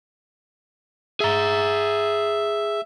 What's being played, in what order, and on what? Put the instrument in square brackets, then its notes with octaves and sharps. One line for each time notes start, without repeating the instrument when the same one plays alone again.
[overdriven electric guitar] G#4 A#5 [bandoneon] E5